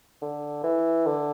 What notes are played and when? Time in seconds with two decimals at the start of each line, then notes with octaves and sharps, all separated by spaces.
0.22 D3
0.63 E3
1.06 D3